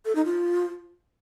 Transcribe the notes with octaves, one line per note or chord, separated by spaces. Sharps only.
A4
D#4
F4